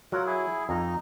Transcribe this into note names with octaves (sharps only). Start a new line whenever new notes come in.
F#3 F4 A#4 F#5
E4 G#4
F2 D#4